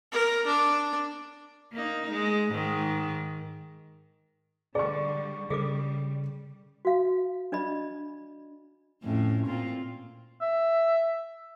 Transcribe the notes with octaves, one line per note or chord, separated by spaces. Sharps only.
A#4
D4
A#3 D#4
G#3
G#2 D#3
D3 G3 G#4 D5 C#6
C#3 G3 G#4 A4 D6
F#4 F5
D4 D5 D#5 B5
F2 A2 C#4
A#2 C4 F4
E5